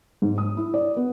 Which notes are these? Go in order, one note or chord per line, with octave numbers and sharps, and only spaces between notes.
G#2
D#6
E4
D5
B3